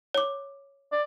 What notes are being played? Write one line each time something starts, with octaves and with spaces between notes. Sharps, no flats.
C#5 D6
D5